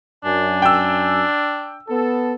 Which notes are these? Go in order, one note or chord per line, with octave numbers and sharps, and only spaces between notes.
F#2 D4 G#5
G5 E6
B3 A4